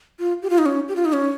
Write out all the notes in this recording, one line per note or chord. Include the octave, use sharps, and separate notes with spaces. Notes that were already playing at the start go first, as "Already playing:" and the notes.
F4
G4
F4
D#4
C#4
G4
F4
D#4
C#4